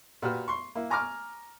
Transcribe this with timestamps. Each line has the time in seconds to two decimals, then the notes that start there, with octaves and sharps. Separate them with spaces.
0.22 A#2 F#4 G4 B4 F6
0.48 C6 C#6
0.75 A#3 E4
0.90 G#5 A#5 C#6 D6 F6